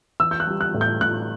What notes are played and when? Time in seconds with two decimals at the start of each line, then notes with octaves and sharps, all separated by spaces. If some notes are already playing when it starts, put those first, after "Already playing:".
0.20 E3 E6
0.31 G6
0.40 F#6
0.47 G3
0.61 F#6
0.74 A2
0.81 G6
1.01 A2 F#6